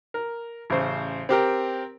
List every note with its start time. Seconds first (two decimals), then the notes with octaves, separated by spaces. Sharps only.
0.14 A#4
0.70 A1 C#3 C5
1.29 C4 G4 A#4